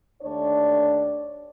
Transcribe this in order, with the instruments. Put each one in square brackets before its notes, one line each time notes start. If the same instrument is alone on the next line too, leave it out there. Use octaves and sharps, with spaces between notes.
[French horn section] D#2 A3 D4 C#5 D5